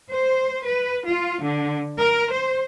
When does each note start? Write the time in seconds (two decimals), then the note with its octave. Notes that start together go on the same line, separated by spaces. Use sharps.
0.10 C5
0.63 B4
1.07 F4
1.41 D3
1.97 A#4
2.31 C5